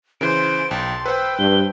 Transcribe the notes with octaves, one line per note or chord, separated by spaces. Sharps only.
C#3 E3 C5 D7
B1 G5 A5 C6
B4 C5 G5 E6
G2 G7